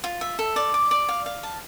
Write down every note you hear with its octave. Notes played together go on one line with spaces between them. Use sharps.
F4
E5
A4
D5
D6
D5
F5
F5
A5